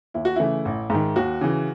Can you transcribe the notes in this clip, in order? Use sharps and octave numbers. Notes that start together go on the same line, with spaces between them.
D#2 E4
F#4
C#3 E3 A3 E4
A1
G#2 D#3
D#2 F#4
C#3 E3